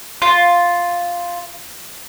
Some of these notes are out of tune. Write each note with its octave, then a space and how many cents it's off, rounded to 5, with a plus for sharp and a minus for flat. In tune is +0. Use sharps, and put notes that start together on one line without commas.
F4 +0